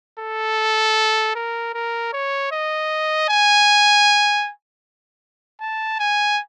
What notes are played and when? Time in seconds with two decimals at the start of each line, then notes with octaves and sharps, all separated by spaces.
0.20 A4
1.36 A#4
1.74 A#4
2.13 C#5
2.52 D#5
3.29 G#5
5.61 A5
6.00 G#5